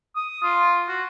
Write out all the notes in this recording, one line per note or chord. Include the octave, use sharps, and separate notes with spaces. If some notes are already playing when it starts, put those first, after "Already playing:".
D#6
F4
F#4